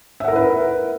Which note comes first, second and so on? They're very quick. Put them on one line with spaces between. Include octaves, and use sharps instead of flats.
E5 F#5 A#4 E4 B4